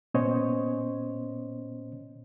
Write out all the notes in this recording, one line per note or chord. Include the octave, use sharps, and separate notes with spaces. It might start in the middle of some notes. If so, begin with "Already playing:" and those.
A#2 B3 C#4 C5 C#5 D#5